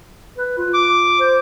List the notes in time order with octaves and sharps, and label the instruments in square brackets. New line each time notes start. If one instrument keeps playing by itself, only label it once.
[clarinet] B4
F4
[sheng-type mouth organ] D6
[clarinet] C5